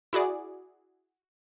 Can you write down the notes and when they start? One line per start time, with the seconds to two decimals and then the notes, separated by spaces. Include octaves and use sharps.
0.13 E4 F#4 G#4 D5